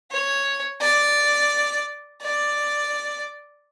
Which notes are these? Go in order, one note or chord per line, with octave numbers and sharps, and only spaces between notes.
C#5
D5
D5